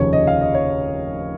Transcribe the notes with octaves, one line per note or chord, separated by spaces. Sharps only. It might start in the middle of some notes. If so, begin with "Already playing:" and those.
Already playing: F1 D#2 C#3 F3 C#5
D#5
F5
D#5
C#5